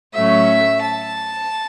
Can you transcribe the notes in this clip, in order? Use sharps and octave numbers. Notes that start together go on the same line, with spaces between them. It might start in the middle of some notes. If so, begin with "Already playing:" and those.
A2 F#3 A3 C#4 E5
A5